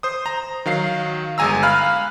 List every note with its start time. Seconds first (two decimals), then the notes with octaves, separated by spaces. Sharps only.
0.03 C5 D#6
0.26 A#5
0.66 D#3 F#3 F5 C7
1.38 G1 G#3 G#5 A#5 E6
1.63 F5 B5 F6 F#6